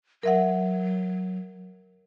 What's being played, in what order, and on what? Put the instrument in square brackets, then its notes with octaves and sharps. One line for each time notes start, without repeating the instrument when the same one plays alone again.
[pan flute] F#3 [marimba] A#4 E5 F#5